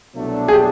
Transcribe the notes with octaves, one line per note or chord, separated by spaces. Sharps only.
C2 B2 F#3 A3 D4
G#4
G4